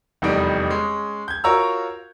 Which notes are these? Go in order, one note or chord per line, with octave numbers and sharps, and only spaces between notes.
F1 E2 D#3 G3 D#4 D7
G#3 C#4
G6 G#6
F4 F#4 A#4 C#5 A#5 E6